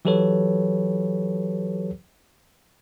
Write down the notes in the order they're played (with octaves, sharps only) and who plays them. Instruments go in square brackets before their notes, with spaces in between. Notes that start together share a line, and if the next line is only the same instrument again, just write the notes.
[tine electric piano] E3 F#3 G4 A4 B4 C#5